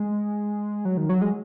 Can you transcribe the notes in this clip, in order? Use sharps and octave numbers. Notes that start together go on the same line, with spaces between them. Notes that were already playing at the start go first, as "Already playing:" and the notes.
Already playing: G#3
F#3
D#3
F#3
G#3